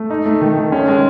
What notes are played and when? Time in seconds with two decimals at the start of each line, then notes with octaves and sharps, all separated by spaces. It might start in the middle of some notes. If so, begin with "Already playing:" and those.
Already playing: A3
0.10 D#4
0.26 A3
0.41 D#3
0.58 D#3
0.72 C#4
0.88 G#3